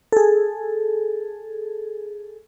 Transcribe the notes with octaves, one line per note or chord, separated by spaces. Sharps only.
G#4 A4